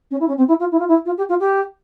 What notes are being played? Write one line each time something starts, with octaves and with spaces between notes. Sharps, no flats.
C#4
E4
C#4
C4
E4
F4
E4
F4
E4
F4
G4
F4
G4